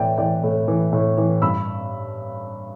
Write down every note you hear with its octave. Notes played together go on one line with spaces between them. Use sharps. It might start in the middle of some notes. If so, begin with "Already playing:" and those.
Already playing: A2 E3 B4 D5 E5 G5
E3 D5 G5
A2
E3
A2
E3
G2 B5 E6